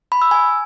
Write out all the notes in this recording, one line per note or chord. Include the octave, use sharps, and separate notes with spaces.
B5
E6
G#5